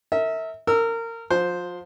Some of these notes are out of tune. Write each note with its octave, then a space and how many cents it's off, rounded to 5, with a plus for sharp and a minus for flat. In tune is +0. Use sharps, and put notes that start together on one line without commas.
A#4 -35 E5 -30
A#4 -25 E6 +0
F3 +35 C5 +0